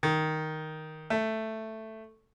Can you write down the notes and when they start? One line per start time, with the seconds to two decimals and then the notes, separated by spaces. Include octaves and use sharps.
0.03 D#3
1.10 A3